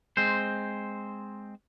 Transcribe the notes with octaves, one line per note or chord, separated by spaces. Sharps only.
G#3 C4 C5